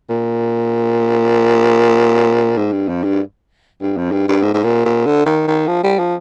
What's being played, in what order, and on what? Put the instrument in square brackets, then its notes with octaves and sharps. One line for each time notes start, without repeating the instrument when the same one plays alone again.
[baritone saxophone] A#2
G#2
G2
F2
G2
G2
F2
G2
G2
G#2
G#2
A#2
A#2
D3
D#3
D#3
F3
G3
F3